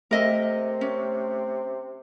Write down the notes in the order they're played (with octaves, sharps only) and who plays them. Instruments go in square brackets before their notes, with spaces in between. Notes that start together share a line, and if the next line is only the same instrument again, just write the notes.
[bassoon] C3 [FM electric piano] A3 [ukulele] A#4 D#5 E5
[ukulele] C#4